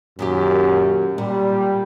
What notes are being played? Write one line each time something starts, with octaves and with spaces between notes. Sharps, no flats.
F#2 A#2 D#3 G4
A#2 G3